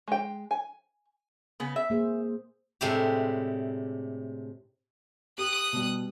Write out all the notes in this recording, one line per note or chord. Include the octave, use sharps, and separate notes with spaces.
G#3 G5
G#5
C#3 B3
E5
A#3 G#4 C5
A2 C3 G#3 D4 E4 G4
G4 D#6 F#6
B2 G3